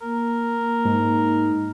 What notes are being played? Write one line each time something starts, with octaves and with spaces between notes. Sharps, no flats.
A#3 A#4
G#2 D#4